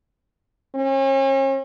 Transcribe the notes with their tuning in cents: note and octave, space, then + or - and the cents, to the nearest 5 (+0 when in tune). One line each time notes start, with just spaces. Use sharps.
C#4 -40